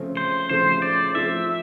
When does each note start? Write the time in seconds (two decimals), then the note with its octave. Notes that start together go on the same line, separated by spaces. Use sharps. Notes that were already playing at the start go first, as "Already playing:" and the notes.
Already playing: C#3 F3 A3 C4
0.17 C5
0.49 C#3 F3 A3 C4 C5
0.82 D5
1.14 F3 A3 C4 F4 A4 E5